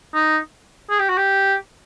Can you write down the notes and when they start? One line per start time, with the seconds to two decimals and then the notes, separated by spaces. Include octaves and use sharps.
0.15 D#4
0.90 G#4
0.99 G4
1.09 F#4
1.18 G4